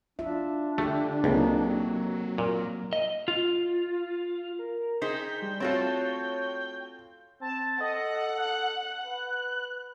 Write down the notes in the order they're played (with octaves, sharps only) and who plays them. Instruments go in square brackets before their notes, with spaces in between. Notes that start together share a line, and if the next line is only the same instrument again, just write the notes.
[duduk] D4 [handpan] F4 E5
[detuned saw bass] D3 [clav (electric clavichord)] A3 [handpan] G4 A4
[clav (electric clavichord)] C#2 [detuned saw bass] F#3 [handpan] A#3 C4 D#4
[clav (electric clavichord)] A#2 [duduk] A#4
[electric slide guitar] D#5
F4
[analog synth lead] A#4
[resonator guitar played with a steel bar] D#4 G#4 C5 [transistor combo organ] G5 [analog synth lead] B6
[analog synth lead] G3
[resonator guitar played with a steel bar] A3 F#4 A4 [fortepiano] C4 F4 [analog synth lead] C#5
[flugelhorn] C4 [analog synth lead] A5
[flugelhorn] A4 [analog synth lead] D#5 [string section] F#5
[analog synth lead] F#6
[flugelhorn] B4